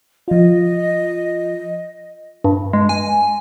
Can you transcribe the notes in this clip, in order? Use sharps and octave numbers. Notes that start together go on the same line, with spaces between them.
F3 F4 D#5
G2
G#3
G#5